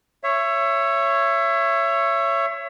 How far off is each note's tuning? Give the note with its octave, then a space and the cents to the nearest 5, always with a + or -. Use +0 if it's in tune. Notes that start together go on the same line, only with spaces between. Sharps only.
C#5 +0 E5 +25